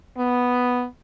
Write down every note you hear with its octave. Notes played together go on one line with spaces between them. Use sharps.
B3